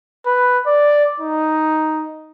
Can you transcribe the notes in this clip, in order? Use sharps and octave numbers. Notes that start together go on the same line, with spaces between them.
B4
D5
D#4